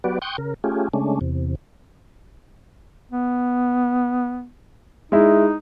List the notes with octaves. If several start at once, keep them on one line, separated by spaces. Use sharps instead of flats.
F#3 B3 F#4 G4 B4 D5
G5 C6 C#6 D#6 F#6 G6
C#3 A#4
A3 C#4 F4 G4 G#4
C#3 G#3 A3 C#4 D4
E2 C3
B3
G#3 D#4 E4